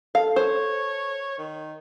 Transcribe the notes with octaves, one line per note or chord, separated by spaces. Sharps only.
A4 F5
C5 C#5
D#3